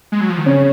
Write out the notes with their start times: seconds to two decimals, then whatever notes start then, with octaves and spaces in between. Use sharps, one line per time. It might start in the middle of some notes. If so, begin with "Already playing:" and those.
0.12 G#3
0.21 F#3
0.29 F3
0.38 D#3
0.46 C#3 C#4